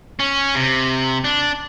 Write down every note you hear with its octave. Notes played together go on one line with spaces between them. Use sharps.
C#4
C3
D4